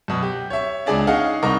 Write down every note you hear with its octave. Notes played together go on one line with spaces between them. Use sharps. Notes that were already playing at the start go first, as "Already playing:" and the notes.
F#2 B2
G4
C#5 E5
C#2 D4 G#4 D5 E5
C#4 D#4 G#4 F5 F#5
C2 D#4 A#4 A#5 C#6